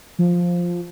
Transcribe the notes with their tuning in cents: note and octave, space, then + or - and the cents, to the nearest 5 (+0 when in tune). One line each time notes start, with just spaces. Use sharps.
F3 +5